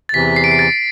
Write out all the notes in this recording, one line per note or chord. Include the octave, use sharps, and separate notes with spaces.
A6
E2 C3 E3 B6
C7
D7
C7
A6